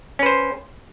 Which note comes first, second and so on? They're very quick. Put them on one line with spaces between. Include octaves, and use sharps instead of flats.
C#4 B4 C5